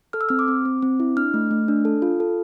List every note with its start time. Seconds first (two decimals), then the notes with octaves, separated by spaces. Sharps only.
0.13 A4 F6
0.21 E6
0.29 C4 F6
0.39 D6
0.48 C4
0.65 C4
0.82 C4
1.00 E4
1.17 D4 F6
1.34 A3
1.51 A3
1.68 D4
1.85 A4
2.02 F4
2.20 A4